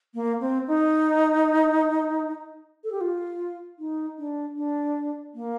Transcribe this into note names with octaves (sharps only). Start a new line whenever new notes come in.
A#3
C4
D#4
A4
G4
F4
D#4
D4
D4
A#3